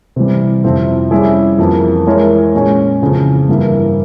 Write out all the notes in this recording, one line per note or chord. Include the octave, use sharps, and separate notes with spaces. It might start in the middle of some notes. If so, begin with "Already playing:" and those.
C3 E3 G3
F2 C3 F3 C4 E4
G3 C#4 E4 G#4
F2 E3 A#3
E3 G#3 E4 A#4 C#5
A#2 G#3 C#4
F2 C#3 E3
G2 E3 A#3 E4